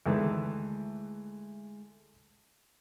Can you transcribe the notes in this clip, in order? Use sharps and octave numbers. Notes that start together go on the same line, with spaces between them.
D2 D#3 E3 G#3 A3 E4